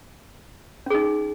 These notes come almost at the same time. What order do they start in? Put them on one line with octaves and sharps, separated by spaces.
C#4 G#4 D#4